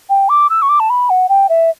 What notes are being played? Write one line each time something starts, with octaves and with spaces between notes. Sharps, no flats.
G5
D6
E6
C#6
D6
A5
B5
F#5
G5
E5